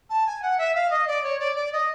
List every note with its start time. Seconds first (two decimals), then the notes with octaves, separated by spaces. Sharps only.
0.10 A5
0.26 G#5
0.42 F#5
0.58 E5
0.75 F5
0.90 D#5
1.07 D5
1.23 C#5
1.39 D5
1.55 D5
1.72 D#5